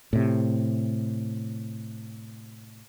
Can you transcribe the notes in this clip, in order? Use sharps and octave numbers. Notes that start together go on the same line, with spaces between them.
A2 C3